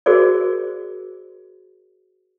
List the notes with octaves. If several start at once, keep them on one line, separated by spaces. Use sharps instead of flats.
F#4 G#4 A#4 C5 D5